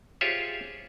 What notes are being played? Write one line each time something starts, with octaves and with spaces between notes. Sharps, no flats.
F4 G4 G#4 C5 C#5 E5